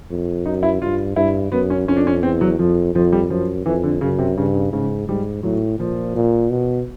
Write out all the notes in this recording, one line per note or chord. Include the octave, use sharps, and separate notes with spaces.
F2
F#2 D#4
E4
G2 F4
G2 E4
F#2 B3
C#4
F2 C#4
D4
C#4
E2 C4
F#3
F2 F3
F2 F3
G3
F#2 F3
F2 E3
D3
F#2 C#3
C3
G2 C#3
C#3
G#2 C#3
G#2 G3
A2 F#3
A#2 F3
A#2
B2